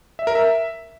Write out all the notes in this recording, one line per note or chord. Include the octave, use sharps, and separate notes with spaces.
E5
A#4
E5